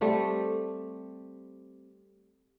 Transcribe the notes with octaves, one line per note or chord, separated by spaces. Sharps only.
G3 A3 C4